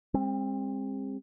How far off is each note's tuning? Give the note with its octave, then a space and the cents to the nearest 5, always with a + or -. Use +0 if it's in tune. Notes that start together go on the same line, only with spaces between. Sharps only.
G#3 -40 C4 +25